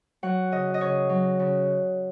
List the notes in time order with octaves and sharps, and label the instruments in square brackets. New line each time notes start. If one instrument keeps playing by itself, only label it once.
[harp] F#3 F#5
C#3 D#5
D#5
C#3 C#5
F#3
C#3